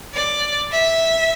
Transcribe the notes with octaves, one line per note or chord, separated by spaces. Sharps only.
D5
E5